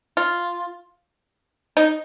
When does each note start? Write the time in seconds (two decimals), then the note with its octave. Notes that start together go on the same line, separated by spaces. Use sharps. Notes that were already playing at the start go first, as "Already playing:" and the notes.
0.17 F4
1.77 D#4